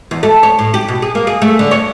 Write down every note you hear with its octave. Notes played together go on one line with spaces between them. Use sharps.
E2
A3
C#5
A2
G4
B2
G#4
A#3
G#4
A3
D3
C#5